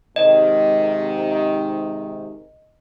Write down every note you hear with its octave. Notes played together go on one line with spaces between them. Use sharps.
G#2 C3 D#3 D#5